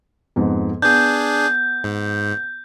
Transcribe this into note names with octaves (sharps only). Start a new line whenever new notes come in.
F2 G#2 B3
B3 D4 G#4 G6
G#2